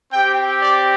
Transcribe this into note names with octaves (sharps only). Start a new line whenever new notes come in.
C4 G4 G5
D5